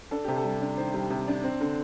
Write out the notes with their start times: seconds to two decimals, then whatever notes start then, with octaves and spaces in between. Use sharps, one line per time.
0.11 D4 A4
0.24 C3 G4
0.36 A4
0.44 G3
0.61 D4
0.77 D#3 C5
0.94 G3
1.10 C3
1.28 D4
1.44 C4
1.61 D3